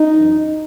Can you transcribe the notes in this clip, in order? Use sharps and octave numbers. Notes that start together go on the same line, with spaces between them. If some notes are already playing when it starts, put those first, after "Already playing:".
Already playing: D#4
F#2 E3